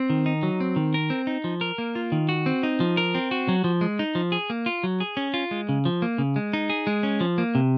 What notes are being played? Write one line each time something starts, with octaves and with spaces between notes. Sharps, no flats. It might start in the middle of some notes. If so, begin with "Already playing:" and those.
Already playing: C4
D#3
D#4
F#3
C4
D#3
A#4
C4
D#4
F3
A#4
A#3
F4
D#3
F#4
C4
D#4
F3
A#4
C4
F#4
F#3
F3
G#3
D#4
F3
G#4
A#3
F4
F#3
G#4
C#4
F4
G#3
C#3
F3
A#3
C#3
G#3
D#4
G#4
G#3
C#4
F3
A#3
C3